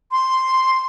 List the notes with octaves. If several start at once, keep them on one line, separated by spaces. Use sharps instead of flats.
C6